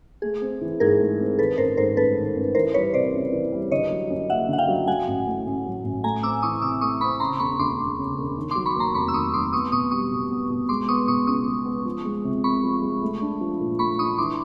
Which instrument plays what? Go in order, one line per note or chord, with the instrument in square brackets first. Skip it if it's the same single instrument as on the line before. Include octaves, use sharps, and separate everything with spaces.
[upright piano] A3 [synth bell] G#4
[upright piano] C4
E3
[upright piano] G#2 [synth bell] G#4 A#4
[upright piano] A3
C4
[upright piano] D#3 [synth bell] A4 B4
[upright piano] A1 [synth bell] A#4 C5
[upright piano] G#2 [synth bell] A#4 C5
[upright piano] A1 [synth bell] A4 B4
[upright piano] D#3
A1
[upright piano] E3 [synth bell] A#4 C5
[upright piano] G3 [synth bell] B4 C#5
[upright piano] C3 [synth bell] C5 D5
[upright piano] C#2
E3
G3
[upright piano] D3 [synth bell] C#5 D#5
[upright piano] F#3
F#2
[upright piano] F#1 [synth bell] E5 F#5
[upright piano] D3 [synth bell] F#5
[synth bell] F5 G5
[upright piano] F#3
[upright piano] F#3 [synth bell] F#5 G#5
[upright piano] A1
A2
A1
F#3
A1
[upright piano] A3 [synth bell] G#5 A#5
[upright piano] C4 [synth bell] D6 E6
[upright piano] E3 [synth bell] C#6 D#6
[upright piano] C3 [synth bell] D6 E6
[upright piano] A3 [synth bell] C#6 D#6
[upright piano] C4 [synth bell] B5 C#6
[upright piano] C#3 [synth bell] A#5 C6
[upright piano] E1 [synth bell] B5 C#6
[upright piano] D2 [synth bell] C6 D6
[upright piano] E1
C#3
E1
D#3
[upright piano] F#3 [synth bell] C6 D6
[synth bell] B5 C#6
[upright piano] D#2 [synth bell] A#5 C6
[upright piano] F1 [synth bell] B5 C#6
[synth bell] E6
[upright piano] D#3 [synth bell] C#6 D#6
[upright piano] F#3 [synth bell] C6 D6
[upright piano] B3 [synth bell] C#6 D#6
[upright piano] B2 [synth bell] C#6 D#6
[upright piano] G3 [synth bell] C#6 D#6
[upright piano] B2
B3
B2
[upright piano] G#3 [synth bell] C6 D6
[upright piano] B3 [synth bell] C#6 D#6
[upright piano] B2 [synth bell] C#6 D#6
[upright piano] C#2 [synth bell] C#6 D#6
[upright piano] G#3
B3
F3
G#3
C3
[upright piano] C2 [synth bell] B5 C#6
[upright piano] F3
G#3
A3
D4
F3
A#2
[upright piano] A3 [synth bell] B5 C#6
[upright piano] D4 [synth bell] C#6 D#6
[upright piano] E3 [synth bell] C6 D6